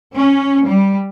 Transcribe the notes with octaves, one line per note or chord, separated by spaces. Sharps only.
C#4
G3